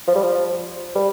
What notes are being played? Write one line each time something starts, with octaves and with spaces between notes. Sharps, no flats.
F3
G3
F3
G3